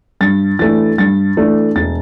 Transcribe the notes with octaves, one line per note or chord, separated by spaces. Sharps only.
G2 A6
E3 A3 D4 A6
G2 A6
E3 A3 D4
E1 A6